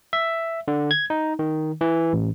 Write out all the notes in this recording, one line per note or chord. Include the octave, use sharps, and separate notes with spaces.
E5
D3
G#6
D#4
D#3
E3
A1